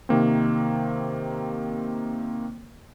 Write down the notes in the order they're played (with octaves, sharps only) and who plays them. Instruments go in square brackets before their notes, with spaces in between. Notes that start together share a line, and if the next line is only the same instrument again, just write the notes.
[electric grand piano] C3 D#3 A#3 C4